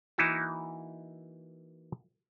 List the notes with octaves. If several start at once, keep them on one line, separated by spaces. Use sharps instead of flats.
E3 A#3 D#4 E4 F#4